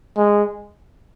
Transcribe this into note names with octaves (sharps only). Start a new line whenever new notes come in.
G#3